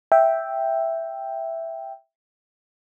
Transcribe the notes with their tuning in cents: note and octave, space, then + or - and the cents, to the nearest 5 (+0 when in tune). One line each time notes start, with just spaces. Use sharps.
E5 +0 G5 +0